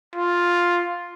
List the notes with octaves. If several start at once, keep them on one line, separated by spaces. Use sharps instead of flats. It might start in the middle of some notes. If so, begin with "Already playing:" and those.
F4